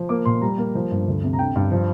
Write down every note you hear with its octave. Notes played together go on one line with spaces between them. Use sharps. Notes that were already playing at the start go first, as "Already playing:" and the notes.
Already playing: F3
A#3 D6
A#2 C6
G3 A#5
A#3
F3
G2
D2
C3
A#5
D3 G5
G2
F3